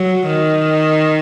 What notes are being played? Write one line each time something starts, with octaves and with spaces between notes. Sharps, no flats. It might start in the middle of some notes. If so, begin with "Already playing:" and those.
Already playing: F#3
D#3